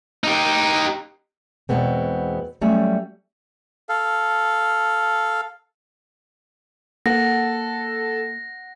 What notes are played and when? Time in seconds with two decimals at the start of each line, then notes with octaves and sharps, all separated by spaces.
0.24 D#4 G4
1.69 E2 G#2 B2 G#3 B3 C4
2.61 F#3 G3 A3 C#4
3.89 A4 F5
7.06 A#3 A4 F#5 A#6